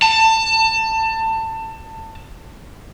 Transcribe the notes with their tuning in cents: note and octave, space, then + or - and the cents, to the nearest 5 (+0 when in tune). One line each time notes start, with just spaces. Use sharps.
A5 +25